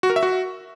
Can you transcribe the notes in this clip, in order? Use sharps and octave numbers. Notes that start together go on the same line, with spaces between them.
F#4
A#4
E5
F#4